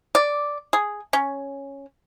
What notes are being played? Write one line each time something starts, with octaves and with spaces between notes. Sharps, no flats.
D5
G#4
C#4